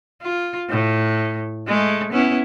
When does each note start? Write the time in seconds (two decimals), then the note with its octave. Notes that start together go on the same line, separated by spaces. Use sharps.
0.22 F4
0.70 A2
1.67 G#3 A3
2.13 B3 C#4 E4